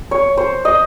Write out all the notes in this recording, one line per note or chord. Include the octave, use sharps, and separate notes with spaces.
C#5
C5
D#5